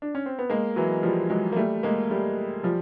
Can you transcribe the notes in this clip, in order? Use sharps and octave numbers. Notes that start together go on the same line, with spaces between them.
D4
C#4
C4
B3
G#3 A#3
E3 F#3
F3 G3
F#3 G#3
A#3
G3 A3
G#3 A#3
G3 A3
F3 G3